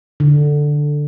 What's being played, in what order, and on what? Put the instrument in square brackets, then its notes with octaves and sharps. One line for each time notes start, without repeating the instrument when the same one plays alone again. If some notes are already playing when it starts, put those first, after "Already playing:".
[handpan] D3